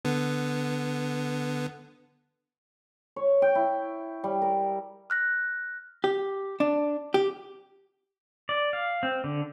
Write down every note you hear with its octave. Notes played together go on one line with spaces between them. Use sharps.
D3 B3
C#5
G5
E4
G3
A#4
F6 F#6 A#6
G4
D4
G4
D5
F5
C4
D3